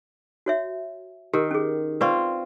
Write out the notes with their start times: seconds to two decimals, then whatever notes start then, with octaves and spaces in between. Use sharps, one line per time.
0.46 F#4 C#5 E5
1.34 D#3 G4 A#4
1.51 C#4 G#4
2.01 C4 F4 B4 D5 C#6